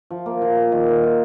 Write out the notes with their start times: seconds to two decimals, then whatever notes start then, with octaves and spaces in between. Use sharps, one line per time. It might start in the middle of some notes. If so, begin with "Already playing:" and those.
0.11 F3
0.26 A#3
0.42 F3
0.56 A#3
0.72 D#3
0.88 D#3
1.03 F4